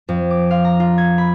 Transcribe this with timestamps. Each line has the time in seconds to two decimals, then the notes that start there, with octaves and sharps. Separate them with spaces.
0.09 F2
0.31 D6
0.51 F5
0.65 A#5
0.80 F4
0.98 G#6
1.18 B5